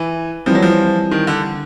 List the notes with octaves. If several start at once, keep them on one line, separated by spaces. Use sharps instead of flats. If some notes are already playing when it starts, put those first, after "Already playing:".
Already playing: E3
E3 F3 G3 C4
F#3
F3
D#3
D3